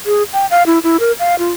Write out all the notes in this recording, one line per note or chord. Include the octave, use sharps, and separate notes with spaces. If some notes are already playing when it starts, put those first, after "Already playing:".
G#4
G5
F5
E4
E4
A#4
F5
F4